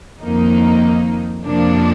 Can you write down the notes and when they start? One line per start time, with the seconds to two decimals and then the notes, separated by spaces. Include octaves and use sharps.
0.21 F2 D#3 A#3 D#4
1.43 F2 C3 F3 A#3 D4